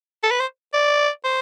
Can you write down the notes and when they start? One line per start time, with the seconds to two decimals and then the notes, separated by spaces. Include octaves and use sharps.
0.23 A4
0.31 B4
0.40 C5
0.74 D5
1.24 C5